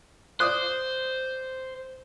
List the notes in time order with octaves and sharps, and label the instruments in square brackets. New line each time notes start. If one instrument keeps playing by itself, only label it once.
[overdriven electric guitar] C5 [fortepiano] D5 D#6 F#6